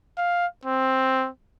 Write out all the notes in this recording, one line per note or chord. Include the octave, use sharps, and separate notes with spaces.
F5
C4